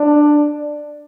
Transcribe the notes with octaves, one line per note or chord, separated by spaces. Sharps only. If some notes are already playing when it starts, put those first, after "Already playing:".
Already playing: D4